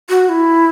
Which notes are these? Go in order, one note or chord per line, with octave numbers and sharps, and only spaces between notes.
F#4
E4